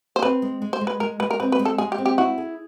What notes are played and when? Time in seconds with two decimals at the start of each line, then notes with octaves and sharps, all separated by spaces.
0.16 C5
0.22 C4 B4
0.42 G#3
0.62 G#3
0.73 C5
0.81 G#3
0.87 B4
1.00 G#3 A#4
1.20 G#3 B4
1.31 A#4
1.40 C4 B4
1.52 B4
1.59 G#3
1.65 A4
1.78 G#3 G#4
1.92 G4
1.98 C4
2.06 G4
2.18 E4 F#4
2.38 G#4